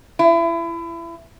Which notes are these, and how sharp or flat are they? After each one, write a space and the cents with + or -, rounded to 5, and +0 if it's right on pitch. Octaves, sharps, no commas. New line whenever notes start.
E4 +30